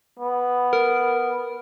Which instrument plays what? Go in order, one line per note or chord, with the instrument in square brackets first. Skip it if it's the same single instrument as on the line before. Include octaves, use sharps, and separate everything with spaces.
[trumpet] B3
[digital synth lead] A#4